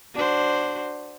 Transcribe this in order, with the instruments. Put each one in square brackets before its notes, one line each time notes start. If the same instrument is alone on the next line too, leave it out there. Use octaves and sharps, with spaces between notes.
[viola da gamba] D4 F#4 C5